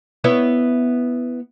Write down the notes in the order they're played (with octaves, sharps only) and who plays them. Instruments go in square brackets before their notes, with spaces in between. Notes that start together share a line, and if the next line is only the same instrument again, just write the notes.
[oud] B3 E4 C#5